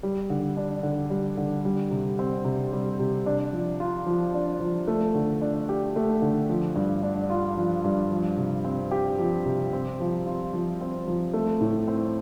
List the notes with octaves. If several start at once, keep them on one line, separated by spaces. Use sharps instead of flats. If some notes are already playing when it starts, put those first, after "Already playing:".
G3
D3
D4
D3
G3
D3
G3
C3
C4
C3
G3
C3
D4
F3
F4
F3
D4
F3
A3
D3
D4
G4
A3
D3
F3
G2
D4
F4
F3
G2
F3
C3
C4
G4
F3
C3
C4
F3
F4
F3
C4
F3
A3
A2
C4